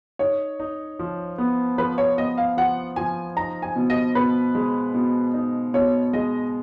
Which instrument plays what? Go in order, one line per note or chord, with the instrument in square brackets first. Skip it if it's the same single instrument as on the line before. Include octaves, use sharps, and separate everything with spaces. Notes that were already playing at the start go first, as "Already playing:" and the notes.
[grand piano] D#4 [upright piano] C#5
[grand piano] D#4
F3
B3
[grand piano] F3 [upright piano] B4
[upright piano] C#5
[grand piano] B3 [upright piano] D#5
[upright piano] F5
[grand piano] F3 [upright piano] F#5
[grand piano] F3 [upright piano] G#5
[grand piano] D#4 [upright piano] A#5
[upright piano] G#5
[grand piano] B2
[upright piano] D#5
[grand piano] B2 [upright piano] B4
[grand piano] G#3
B2
D#4
[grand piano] B2 [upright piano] C#5
[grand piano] G#3 [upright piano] D#5